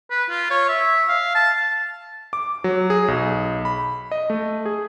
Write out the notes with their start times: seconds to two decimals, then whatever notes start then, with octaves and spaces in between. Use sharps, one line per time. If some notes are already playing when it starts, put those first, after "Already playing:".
0.10 B4
0.29 F4
0.50 C#5
0.69 E5
1.08 F5
1.35 A5
2.33 D6
2.64 F#3
2.90 G#4
3.08 B1
3.65 B5
4.12 D#5
4.30 A3
4.66 G#4